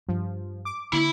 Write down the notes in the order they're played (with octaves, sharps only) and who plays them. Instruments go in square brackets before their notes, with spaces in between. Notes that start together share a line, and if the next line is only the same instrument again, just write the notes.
[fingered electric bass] G2 [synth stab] F3
[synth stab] D6
[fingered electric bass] D3 A#3 [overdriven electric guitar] E4 B5